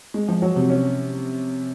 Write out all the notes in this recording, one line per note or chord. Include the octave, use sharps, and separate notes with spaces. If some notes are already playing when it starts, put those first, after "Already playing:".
G#3
F3
F#3
C3
C#4